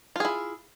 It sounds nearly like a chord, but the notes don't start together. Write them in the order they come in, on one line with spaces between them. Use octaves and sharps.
F4 G#4 E4